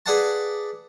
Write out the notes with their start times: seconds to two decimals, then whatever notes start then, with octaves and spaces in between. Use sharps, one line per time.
0.06 G#4 B4 D5 F5 F#5 A5